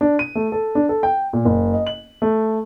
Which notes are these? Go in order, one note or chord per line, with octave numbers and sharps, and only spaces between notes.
D4
D#7
A3
A4
D4
A4
G5
A#2
F#1
D#5
F#7
A3